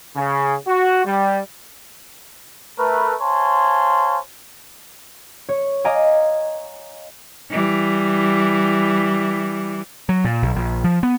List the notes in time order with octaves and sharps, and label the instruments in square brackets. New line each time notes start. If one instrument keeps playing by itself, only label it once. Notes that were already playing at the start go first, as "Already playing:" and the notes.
[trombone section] C#3
F#4
G3
[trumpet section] A3 A#4 B4
C5 C#5 F5 G#5 A5 C6
[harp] C#5
D#5 F5 G#5 A#5 D6
[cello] E3 G3
[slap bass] F#3
A#2
B1
A#1
F3
B3